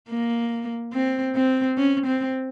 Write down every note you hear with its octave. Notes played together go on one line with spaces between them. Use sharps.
A#3
C4
C4
C#4
C4